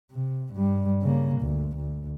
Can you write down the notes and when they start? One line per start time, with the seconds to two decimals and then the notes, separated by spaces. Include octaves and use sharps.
0.11 C3
0.54 G2 G3
1.02 C#3 A#3
1.41 D2
1.76 D2